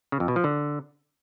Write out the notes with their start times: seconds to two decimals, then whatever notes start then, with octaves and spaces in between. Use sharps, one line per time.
0.12 C#3
0.20 F2
0.28 B2
0.36 F3
0.44 D3